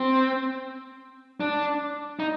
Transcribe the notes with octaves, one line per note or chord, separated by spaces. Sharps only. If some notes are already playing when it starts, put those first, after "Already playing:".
Already playing: C4
D4
D#4